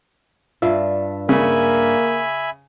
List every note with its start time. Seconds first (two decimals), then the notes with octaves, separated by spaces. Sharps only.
0.62 G2 D4 F4 E5
1.29 C#3 A#3 E5 G#5 B5